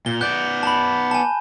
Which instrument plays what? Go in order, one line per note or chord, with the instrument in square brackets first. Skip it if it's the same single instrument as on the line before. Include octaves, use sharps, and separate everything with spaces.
[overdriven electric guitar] A#2 [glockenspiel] G7
[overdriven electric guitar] B3 D5 [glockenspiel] F#6 G6
[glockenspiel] A5 B5
G#5 A5